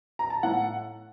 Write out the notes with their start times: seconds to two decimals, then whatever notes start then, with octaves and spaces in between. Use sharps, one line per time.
0.19 A#5
0.30 A5
0.43 A2 F#5